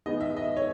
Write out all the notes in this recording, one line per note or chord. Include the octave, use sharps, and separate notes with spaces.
D#3 G#3 B3 D#4 D#5
E5
D#5
C#5